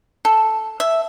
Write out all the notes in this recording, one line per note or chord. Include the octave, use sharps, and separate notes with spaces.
A4
E5